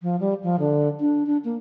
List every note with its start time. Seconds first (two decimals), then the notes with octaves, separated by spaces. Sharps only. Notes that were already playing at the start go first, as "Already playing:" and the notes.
0.02 F3
0.20 G3
0.43 F3
0.59 D3
1.00 D4
1.26 D4
1.44 A#3